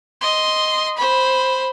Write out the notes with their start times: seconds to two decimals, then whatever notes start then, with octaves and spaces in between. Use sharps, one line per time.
0.21 D#5 C6
0.97 C5 B5